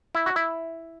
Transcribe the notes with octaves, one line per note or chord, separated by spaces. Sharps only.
E4
F#4
E4